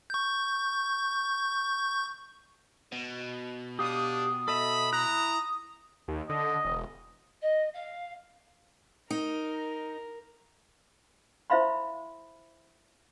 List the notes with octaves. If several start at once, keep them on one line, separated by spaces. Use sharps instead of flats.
C#6 G6
B2
D4 G4 F5 D#6
A4 D#5 E5 B5
E4 A#5 F#6
D#2
D3 D#5
E1
D#5
F5
D#4 A#4
E4 C5 E5 F5 B5 C6